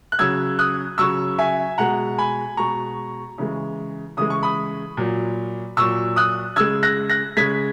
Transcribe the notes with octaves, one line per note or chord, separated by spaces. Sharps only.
F#6
C#3 F#3 E6 G#6
D#6 F#6
C#3 F#3 C#6 E6
E5 G#5
B2 G#3 F#5 A#5
G#5 B5
B2 G#3 A#5 C#6
C#3 E3 G#3
C#3 E3 G#3 D#6
C#6
B5 D#6
A#2 F#3
A#2 F#3 C#6 E6
D#6 F#6
C#3 G#3 E6 G#6
F#6 A#6
F#6 A#6
C#3 G#3 G#6 B6